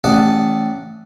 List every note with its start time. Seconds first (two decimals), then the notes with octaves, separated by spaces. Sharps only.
0.04 A1 D5 F#5 A5 D#6